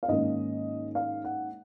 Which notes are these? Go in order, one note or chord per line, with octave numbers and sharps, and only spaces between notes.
F5
G#2 D#3 A#3 C#4 D#5
F5
F#5